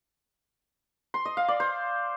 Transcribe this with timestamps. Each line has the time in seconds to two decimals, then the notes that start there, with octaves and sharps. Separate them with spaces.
1.14 C6
1.25 D#5
1.37 F5
1.48 D5
1.60 C5